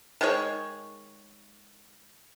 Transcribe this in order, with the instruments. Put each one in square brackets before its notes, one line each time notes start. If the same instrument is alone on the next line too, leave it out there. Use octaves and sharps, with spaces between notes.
[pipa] D#3 G#3 G#4 C#5